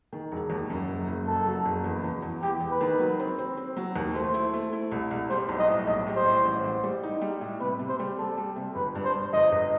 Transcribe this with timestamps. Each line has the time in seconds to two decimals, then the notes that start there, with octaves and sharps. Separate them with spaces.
0.13 D#3
0.32 E1
0.50 D#2
0.70 F#2
0.89 F#1
1.08 F#1
1.27 F#2 A4
1.46 F#3
1.66 F#1
1.84 E2
2.04 E2
2.22 E2
2.42 E2 G4
2.61 E2
2.71 B4
2.81 D#3
2.99 F#3
3.20 C4
3.39 C4
3.57 C4
3.76 F#3
3.96 D#2
4.15 A3 C5
4.34 E4
4.53 A3
4.73 E4
4.91 C2
5.11 C2
5.30 G3 C5
5.49 B1
5.58 D#5
5.68 A2
5.87 B1 D#5
6.07 G3
6.16 C5
6.26 A2
6.45 A1
6.64 A1
6.83 G3
7.03 D#4
7.21 G3
7.41 A2
7.61 C3 B4
7.79 C3
7.89 C5
7.99 G3
8.18 G3 A4
8.37 G3
8.56 C3
8.75 G1 B4
8.95 G2
9.04 C5
9.15 G2
9.33 G1 D#5
9.52 G1